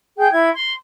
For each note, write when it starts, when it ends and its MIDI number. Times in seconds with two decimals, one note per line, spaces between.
0.17 0.30 68
0.17 0.30 79
0.17 0.30 91
0.31 0.49 64
0.31 0.49 92
0.51 0.71 84